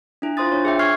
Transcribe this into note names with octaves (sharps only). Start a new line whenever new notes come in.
D4 E4
F4 C5 C6 D#6 A6
D4 C#5
G#4 E5 G5
C#6 F6 G#6 C7